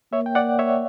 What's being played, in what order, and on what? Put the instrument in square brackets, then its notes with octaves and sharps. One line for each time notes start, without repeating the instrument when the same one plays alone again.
[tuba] A#3 [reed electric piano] C#5 E5
[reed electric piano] G5
D5 F#5
C#5 E5